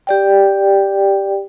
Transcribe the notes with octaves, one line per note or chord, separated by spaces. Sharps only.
G4 D5 G5